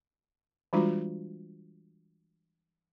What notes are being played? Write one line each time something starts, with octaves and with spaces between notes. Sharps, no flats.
E3 G3 G#3 D4 F4 F#4